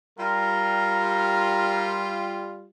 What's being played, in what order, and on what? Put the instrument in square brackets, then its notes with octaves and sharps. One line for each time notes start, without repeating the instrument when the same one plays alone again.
[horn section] G3 F4 [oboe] A#4